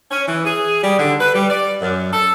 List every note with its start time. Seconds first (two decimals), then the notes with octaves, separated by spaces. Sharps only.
0.10 C#4
0.27 E3
0.45 G#4
0.83 G3
0.98 D3
1.19 B4
1.33 G3
1.50 D5
1.81 F#2
2.11 A4